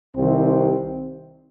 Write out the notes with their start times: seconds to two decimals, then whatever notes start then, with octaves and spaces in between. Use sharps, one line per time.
0.17 C2 C3 D#3 C4